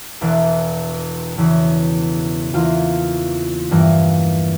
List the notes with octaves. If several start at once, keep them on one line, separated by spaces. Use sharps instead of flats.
E1 E2 E3
E2 C#3 E3
E2 E3 A#3 F4
G2 E3 A#3